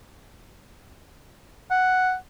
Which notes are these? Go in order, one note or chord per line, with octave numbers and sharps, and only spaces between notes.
F#5